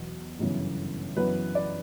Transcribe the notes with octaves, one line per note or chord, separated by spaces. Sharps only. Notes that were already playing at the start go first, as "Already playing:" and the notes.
Already playing: E2 B2 F#3
G1 F#2 C#3 E3 B3
F#2 E3 B3 B4
D5